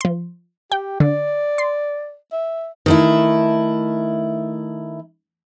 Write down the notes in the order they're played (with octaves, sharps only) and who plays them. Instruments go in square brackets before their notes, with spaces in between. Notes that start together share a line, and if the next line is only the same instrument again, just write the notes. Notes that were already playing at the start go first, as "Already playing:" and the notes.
[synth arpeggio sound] F3 C6
[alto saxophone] G4 [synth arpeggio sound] G5
[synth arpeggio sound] D3 [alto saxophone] D5
[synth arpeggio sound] C6
[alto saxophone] E5
[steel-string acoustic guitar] D#3 A3 E4